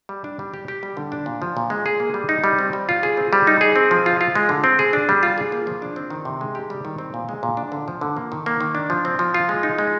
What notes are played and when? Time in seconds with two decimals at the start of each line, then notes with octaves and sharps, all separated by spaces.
0.09 G3
0.24 D4
0.39 G3
0.54 G4
0.68 G4
0.83 G3
0.97 D3
1.12 D4
1.26 A#2
1.42 F3
1.57 A#2
1.70 G#3
1.86 G#4
2.00 A#3
2.14 G3
2.29 D#4
2.44 G3
2.59 C4
2.73 G3
2.89 F4
3.03 G#4
3.17 C4
3.33 G3
3.47 D#4
3.61 G#4
3.76 C4
3.91 F3
4.06 F4
4.21 F4
4.35 G#3
4.49 D3
4.64 C4
4.79 G#4
4.93 D4
5.09 G3
5.23 F4
5.38 G#4
5.52 A#3
5.67 F3
5.82 D4
5.96 C4
6.10 D#3
6.25 C3
6.41 G#3
6.55 G4
6.70 G3
6.85 D#3
6.98 C4
7.14 A#2
7.29 G#3
7.43 A#2
7.57 D4
7.72 D3
7.88 F3
8.01 D3
8.17 A#3
8.32 D#3
8.46 A#3
8.61 D#3
8.75 D4
8.90 F3
9.05 C4
9.19 F3
9.34 F4
9.49 G#3
9.63 D#4
9.78 G#3